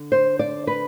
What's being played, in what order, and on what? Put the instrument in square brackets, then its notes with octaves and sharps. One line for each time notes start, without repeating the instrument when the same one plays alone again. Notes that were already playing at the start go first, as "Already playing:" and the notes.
Already playing: [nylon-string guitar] D3
C5
D5
B4